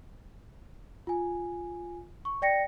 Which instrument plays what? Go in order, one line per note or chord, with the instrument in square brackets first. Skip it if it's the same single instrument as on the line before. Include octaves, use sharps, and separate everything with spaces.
[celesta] F4 G#5
C#6
D5 G5 A#6 C#7